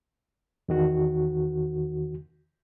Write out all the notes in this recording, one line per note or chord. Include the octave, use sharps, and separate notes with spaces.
E2 D#3 F#4